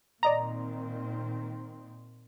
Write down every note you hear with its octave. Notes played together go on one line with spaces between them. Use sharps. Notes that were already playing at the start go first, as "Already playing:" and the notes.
A#2 D#3 C4 D5 D#5 A#5